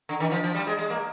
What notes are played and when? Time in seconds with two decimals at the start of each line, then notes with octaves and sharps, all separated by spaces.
0.09 D3
0.20 D#3
0.32 F3
0.44 F3
0.55 G3
0.67 G#3
0.79 G#3
0.90 A#3